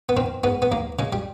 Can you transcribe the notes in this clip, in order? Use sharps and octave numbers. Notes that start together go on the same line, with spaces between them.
B3
D#3 C4
G#2 B3
B3
D#2 A#3
C#3 G#3
G3